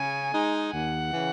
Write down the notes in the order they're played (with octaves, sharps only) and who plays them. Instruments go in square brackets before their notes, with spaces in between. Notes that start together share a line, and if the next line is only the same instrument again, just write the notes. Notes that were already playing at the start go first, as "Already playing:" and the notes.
Already playing: [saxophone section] C#3 [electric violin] G#5
[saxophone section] G#3 D#4
[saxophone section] D#2 [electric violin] F#5
[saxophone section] C#3 E3